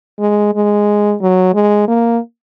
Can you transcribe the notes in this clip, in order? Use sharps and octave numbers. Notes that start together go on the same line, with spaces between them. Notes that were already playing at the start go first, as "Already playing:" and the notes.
G#3
G#3
F#3
G#3
A#3